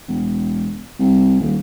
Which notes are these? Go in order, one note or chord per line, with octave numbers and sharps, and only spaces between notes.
E1
C2
D#1